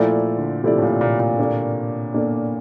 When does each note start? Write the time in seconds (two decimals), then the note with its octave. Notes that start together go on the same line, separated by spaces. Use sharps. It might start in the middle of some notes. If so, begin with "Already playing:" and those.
Already playing: A#2 F3 A3 E4 A4 D5
0.38 D3
0.63 C3 F3 A3 E4 A4 D5
0.78 A2
0.82 A#2
1.01 A#2
1.20 A#2
1.39 A#3 D4 A4 D5
2.14 A#3 D4 A4 D5